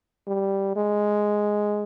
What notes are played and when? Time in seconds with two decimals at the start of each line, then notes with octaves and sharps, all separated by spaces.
0.28 G3
0.76 G#3